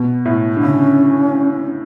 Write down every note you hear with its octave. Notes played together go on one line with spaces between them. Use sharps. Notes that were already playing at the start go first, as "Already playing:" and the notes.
Already playing: B2 B3
A2
D3
C#3 C#4